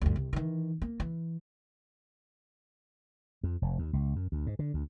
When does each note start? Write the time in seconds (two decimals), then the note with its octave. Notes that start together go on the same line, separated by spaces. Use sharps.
0.02 D2 G2
0.16 C2
0.33 D#3 E3
0.82 A#3
1.00 E3
3.43 F2
3.62 F1
3.79 D#2
3.93 C#2
4.16 F#2
4.32 D2
4.47 G#2
4.59 D3
4.74 D2